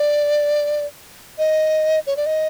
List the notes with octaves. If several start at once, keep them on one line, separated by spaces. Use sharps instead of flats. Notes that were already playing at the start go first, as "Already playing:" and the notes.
Already playing: D5
D#5
C#5
D5
D#5